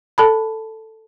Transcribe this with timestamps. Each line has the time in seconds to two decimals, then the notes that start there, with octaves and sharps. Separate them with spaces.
0.18 A4 A5 B5